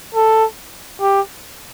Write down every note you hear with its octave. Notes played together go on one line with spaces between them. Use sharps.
A4
G4